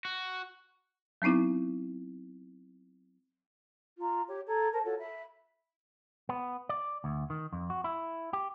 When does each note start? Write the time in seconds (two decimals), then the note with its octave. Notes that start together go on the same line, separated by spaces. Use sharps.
0.05 F#4
1.22 F#3 B3 C4 D#4 E4
3.99 F4 A#5
4.28 G4 C#5
4.47 A4 A#5 G#6
4.72 A#4 C5 A5
4.84 F4 F#4 A4 C#5
4.98 E5 B5
6.29 B3
6.69 D5
7.04 D2
7.30 D#3
7.53 F2
7.70 F#4
7.84 E4
8.33 G4